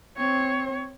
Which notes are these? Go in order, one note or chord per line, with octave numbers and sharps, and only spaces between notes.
C4 C#5